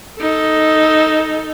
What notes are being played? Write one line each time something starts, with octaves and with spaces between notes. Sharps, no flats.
D#4 A4